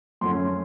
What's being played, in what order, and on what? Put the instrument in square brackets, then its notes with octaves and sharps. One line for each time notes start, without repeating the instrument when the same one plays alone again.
[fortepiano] F#2 F3 A3 C#4 C6